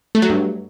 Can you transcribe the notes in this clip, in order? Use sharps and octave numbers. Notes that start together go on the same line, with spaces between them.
A3
F#3
G2